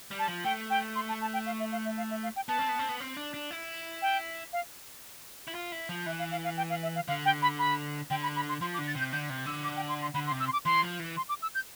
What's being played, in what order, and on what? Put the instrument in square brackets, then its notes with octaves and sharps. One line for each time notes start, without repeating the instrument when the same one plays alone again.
[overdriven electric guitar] G3
[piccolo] A5
[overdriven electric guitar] F3
[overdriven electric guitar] A3 [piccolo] G5
[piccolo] G5
C6
A5
A5
G5
F5
E5
F5
E5
F5
E5
F5
G5
[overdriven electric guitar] B3 [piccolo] A5
[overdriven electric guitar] C4
B3
C4
B3
C4
D4
D4
E4
[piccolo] G5
F5
[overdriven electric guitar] E4
F4
E4
F3
[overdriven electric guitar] E3 [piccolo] E5
[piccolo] F5
F5
F5
G5
F5
E5
F5
[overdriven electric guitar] D3 [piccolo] F5
[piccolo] G5
B5
B5
[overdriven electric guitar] D3 [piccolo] G5
[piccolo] B5
B5
C6
[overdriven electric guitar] F3 [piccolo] C6
[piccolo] D6
[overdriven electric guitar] D3
[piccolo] A6
[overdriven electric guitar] C3 [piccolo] G6
[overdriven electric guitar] D3 [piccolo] G6
[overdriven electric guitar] C3
[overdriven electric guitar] D3 [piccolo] E6
[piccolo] D6
G5
C6
C6
[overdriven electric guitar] D3 [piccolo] B5
[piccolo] C6
[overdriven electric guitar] C3
[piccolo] E6
C6
D6
[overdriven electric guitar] E3 [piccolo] C6
[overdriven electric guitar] F3
E3
[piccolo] C6
D6
E6
G6